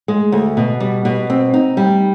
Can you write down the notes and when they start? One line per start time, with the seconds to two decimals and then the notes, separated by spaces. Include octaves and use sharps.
0.08 G#3
0.32 D2
0.57 B2
0.80 G3
1.05 B2
1.30 C4
1.54 D#4
1.77 G3